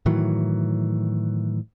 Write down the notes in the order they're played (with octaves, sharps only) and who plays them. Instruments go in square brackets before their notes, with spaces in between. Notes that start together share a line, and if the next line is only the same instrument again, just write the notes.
[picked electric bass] A2 D#3 E3 F#3